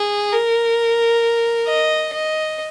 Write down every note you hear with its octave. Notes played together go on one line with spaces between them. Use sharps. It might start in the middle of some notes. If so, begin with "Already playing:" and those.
Already playing: G#4
A#4
D#5
D#5